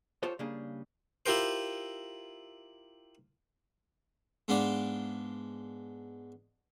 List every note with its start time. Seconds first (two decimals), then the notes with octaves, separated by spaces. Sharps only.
0.23 F4 G4 A4 C5 C#5
0.39 C#3 G3 A#3 D4 G#4
1.26 E4 F4 G4 A#4 C5
4.48 G#2 G#3 B3 D4 F5 D6